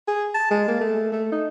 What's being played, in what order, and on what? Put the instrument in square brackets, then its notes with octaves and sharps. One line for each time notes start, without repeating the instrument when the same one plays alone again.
[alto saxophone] G#4
A5
G#3
A#3
A3
A3
D#4